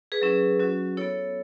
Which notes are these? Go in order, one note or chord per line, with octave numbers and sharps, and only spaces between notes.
G#4 B4
F#3 C#4 E4
F#3 C#4 F#4
B3 E4 A4 C#5